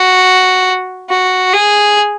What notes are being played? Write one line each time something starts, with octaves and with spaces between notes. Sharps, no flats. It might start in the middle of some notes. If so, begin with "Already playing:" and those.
Already playing: F#4
F#4
G#4